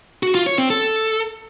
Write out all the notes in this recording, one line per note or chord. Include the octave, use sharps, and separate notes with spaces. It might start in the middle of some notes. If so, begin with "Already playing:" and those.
F#4
F4
C#5
C4
A4